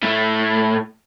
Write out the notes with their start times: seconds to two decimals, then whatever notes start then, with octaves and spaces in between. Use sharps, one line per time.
0.03 A2 A3